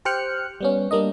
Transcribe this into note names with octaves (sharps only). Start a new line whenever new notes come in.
G4 C5 G5 F6 F#6 C#7
G3 B3 C#4
G3 A#3 D4 D#5